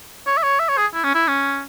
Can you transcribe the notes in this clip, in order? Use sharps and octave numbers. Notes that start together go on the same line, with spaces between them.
C#5
E5
C#5
E5
C#5
G#4
E4
C#4
E4
C#4